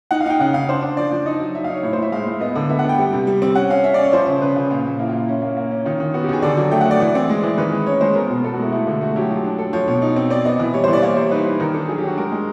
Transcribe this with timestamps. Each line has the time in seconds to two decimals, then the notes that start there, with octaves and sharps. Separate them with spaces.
0.11 D#4 F#5
0.21 F5
0.26 D#4 G5
0.40 C#3 F#5
0.54 C#3 F5
0.69 D4 C5
0.83 D4
0.97 F3 D5
1.11 F3
1.26 D#4 D#5
1.40 F#3
1.54 D#4 E5
1.64 F5
1.69 D#4 C#5
1.83 A2 C#5
1.93 C5
1.98 A2 E5
2.12 G#3 F5
2.27 A2
2.41 B3 D#5
2.55 D3
2.69 B3 E5
2.79 F#5
2.84 B3
2.89 G5
2.98 G3
3.13 C3
3.27 G3
3.42 C4
3.55 C#4 F#5
3.70 C#4 F5
3.84 C#4 E5
3.94 D5
3.99 C#4 C#5
4.13 F3 C5
4.28 C#3
4.42 C#3 B4
4.56 C#3 F4
4.70 A#2 F4
4.85 A#2
4.99 A#3 E4
5.09 F4
5.13 A#2
5.19 E4
5.29 C#4
5.42 A#3
5.57 A#3
5.71 C#4
5.85 D#3 F4
6.00 D#3
6.14 B3 F#4
6.24 G4
6.29 D#3 G#4
6.42 D3 D5
6.57 F#3
6.71 A3 G5
6.81 F#5
6.86 A3
6.91 D5
7.00 E3
7.15 C4
7.29 G#3
7.43 E3
7.58 D#3 B4
7.72 G#3
7.87 C#4 C#5
8.01 G#3 C5
8.15 B3 A#4
8.30 B2
8.44 B3 A4
8.53 F#4
8.59 G#3 E4
8.72 A3 E4
8.87 D3 F4
9.01 A3 F#4
9.16 F#3 G4
9.30 F3
9.44 D4
9.58 D4 A4
9.73 F3 C#5
9.88 B2 C#5
10.02 D#4
10.16 C4
10.31 C4 D5
10.45 B3 D#5
10.60 E3
10.74 G3 C#5
10.84 C5
10.88 E3
10.93 D5
11.02 A#3 C#5
11.17 G3 C5
11.31 D#4 B4
11.46 D#4
11.60 D#3 A#4
11.74 D4 A4
11.88 F#3 G#4
11.98 G4
12.04 D4 F#4
12.17 G#3 A#4
12.32 G#3